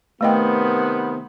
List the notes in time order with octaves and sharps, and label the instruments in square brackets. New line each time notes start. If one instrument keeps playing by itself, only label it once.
[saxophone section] C3 D#3 B3 [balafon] A3 D#5 G5